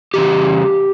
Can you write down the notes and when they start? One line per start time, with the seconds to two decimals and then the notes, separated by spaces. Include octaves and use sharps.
0.14 C#3 E3 G3 G4